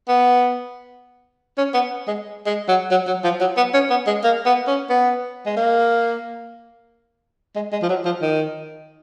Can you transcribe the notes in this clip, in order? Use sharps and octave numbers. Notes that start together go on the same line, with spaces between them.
B3
C#4
B3
G#3
G#3
F#3
F#3
F#3
F3
F#3
B3
C#4
B3
G#3
A#3
B3
C#4
B3
G#3
A#3
G#3
G#3
F3
F#3
F3
D#3